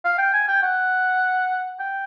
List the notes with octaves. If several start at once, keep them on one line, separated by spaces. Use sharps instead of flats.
F5
G5
G#5
G5
F#5
G5